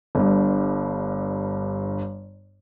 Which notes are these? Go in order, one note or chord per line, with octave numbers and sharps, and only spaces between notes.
G1 G2